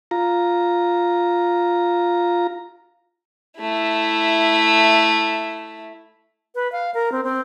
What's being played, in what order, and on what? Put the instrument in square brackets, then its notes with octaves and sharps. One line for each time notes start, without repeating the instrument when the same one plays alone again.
[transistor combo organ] F4 A#5
[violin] A3 E4
[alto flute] B4
F5
A#4
C4
C4